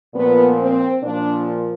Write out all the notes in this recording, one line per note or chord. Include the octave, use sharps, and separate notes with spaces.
A#2 F3 B3
C4
A#2 F3 D4